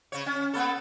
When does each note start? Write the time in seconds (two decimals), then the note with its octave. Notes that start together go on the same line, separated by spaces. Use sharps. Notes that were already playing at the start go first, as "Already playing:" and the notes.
0.12 C#3 C#5
0.26 C#4
0.54 A#3 B3 A4